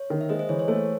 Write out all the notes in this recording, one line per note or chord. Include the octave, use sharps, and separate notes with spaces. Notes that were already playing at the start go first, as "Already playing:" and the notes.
Already playing: C#5
D#3
E5
G#3 C5 D#5
C5 D#5
E3 C#5
C#5
A3 C5